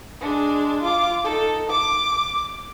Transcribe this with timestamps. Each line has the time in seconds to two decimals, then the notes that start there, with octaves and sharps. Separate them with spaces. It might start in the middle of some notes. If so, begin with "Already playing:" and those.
0.21 G#3 D4
0.83 F4 D6
1.24 D#4 A4
1.69 D6